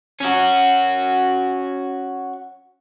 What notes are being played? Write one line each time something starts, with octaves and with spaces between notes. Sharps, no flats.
C#4 F#4